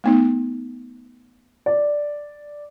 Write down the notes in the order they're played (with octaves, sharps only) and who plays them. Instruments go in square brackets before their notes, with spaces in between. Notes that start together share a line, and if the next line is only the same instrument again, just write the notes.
[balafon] A3 B3 D#4
[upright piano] D5